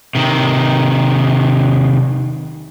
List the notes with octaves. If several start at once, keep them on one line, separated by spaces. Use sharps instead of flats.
C3 D#3